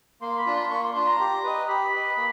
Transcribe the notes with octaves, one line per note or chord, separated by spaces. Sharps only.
A#3 C6
B5
D4 F4
C6
A#3 C#6
C6
D4 F4 C6
A#5
G4
B4 D#5
G4 B5
B4 D#5
A#3